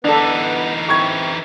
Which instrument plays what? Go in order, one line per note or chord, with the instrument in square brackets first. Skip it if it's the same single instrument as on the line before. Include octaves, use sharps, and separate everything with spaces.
[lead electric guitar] E3 D#4 [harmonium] B3 B4 [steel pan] D4 A4
[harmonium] C4 E4 [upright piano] C#6 G#6